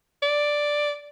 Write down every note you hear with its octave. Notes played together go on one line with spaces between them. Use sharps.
D5